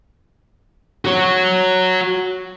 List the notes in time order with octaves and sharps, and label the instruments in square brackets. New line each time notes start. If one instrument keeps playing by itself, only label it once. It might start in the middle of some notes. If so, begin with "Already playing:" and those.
[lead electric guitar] F#4 C#5